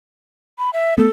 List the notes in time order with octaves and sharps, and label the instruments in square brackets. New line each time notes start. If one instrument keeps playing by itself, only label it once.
[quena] B5
E5
[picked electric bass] A3 B3 [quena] A4